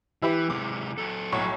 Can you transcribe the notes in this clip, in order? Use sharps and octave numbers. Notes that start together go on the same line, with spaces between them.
E3 E4 G4 B4
C3 G#3 D6
F#3 A4
B1 A2 C#5